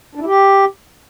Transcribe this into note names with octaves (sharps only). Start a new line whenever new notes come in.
D4
E4
G4